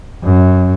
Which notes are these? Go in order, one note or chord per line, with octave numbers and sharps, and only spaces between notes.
F#2